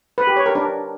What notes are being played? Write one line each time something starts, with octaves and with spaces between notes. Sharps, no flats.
B4
G4
C#5
A#4
D4